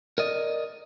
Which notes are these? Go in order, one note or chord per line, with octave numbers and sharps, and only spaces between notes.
A#4 D5 D#5